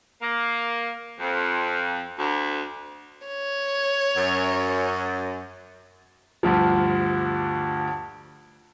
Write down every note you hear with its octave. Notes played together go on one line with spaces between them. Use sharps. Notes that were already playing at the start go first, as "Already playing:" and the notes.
A#3
F2
D2
C#5
F#2
D2 G2 F3